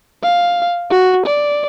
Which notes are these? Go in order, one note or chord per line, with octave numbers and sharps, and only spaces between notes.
F5
F#4
D5